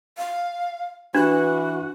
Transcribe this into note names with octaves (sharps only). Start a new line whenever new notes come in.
F5
E3 D4 F#4 B4 F#6